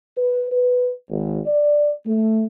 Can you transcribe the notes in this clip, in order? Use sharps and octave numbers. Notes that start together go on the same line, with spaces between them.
B4
B4
G#1
D5
A3